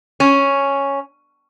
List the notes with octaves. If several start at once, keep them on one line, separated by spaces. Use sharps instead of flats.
C#4